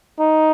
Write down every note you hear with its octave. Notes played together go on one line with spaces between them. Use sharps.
D#4